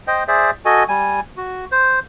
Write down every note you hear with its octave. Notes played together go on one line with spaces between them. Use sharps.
C5 D#5 G5
G#4 C5 D5 E5
F#4 A4 D#5 G#5
G3 G#5
F#4
C5